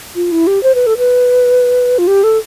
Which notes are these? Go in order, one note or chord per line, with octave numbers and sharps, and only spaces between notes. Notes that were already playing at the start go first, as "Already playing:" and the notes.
F4
E4
G4
C5
B4
A4
B4
F4
G4
A4